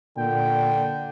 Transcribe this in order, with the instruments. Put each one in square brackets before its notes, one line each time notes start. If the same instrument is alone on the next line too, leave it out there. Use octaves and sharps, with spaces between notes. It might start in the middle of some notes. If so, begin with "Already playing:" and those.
[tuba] A#2 [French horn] D3 [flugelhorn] G5